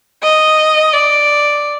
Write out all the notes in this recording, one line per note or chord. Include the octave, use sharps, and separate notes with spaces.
D#5
D5